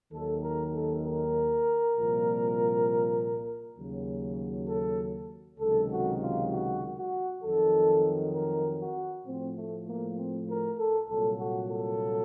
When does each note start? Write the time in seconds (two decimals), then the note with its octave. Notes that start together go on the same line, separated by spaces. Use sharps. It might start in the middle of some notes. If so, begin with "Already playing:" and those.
0.11 D#2 D#3 F#3 A4
0.42 A#4
0.72 A4
1.03 A#4
1.95 C2 A#2 F3
3.77 D#2 C#3 F#3
4.68 A4
5.59 C#2 C3 D#3 F#3 A4
5.91 F#4
6.21 F4
6.51 F#4
6.97 F#4
7.43 F2 D#3 F#3 A4
8.34 A#4
8.80 F#4
9.26 A2 F3 C4
9.55 A3
9.86 A#3
10.17 C4
10.48 A#4
10.78 A4
11.08 C2 A#2 F#3 A4
11.38 F#4
11.69 A4